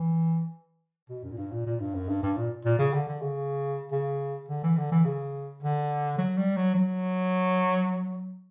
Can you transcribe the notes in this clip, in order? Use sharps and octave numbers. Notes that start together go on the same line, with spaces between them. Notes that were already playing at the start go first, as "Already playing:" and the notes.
Already playing: E3
B2
F#2
A#2
G2
A#2
A#2
G2
F#2
G2
G2
A#2
A#2
C#3
D3
D3
C#3
C#3
D3
E3
D3
E3
C#3
D3
F#3
G3
F#3
F#3